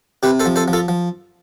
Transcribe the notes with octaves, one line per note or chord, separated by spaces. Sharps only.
C3 G4 B4
A4 C5
F3
A4 C5
F3
F4 A4
F3